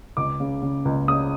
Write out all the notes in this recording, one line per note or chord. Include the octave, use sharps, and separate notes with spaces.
C#2 D6
C#3
C#3
C#2
C#3 D#6